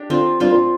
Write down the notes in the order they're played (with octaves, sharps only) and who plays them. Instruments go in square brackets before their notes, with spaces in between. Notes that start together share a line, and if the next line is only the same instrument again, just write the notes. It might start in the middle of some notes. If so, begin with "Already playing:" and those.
Already playing: [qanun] D4 G4
[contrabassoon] D3 [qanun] C4 F4
[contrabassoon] G2 [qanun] C4 F4
[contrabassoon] A#2